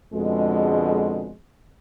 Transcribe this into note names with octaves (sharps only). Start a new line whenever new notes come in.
F2 B2 D3 G#3